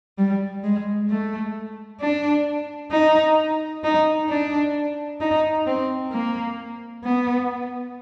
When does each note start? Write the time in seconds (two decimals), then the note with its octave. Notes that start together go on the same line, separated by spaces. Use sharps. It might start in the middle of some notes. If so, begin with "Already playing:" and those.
0.18 G3
0.64 G#3
1.10 A3
2.01 D4
2.92 D#4
3.84 D#4
4.29 D4
5.21 D#4
5.66 C4
6.11 A#3
7.04 B3